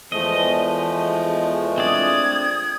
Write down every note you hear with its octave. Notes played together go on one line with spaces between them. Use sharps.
E2 F3 G#3 A3 D#5
C4 D4 D5 D#6 G#6